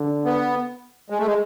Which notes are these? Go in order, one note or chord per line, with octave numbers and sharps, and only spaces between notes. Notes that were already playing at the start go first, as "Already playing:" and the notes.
Already playing: D3
B3
G#3
A3
G#3